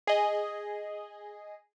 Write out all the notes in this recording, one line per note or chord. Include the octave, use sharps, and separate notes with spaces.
G#4 D#5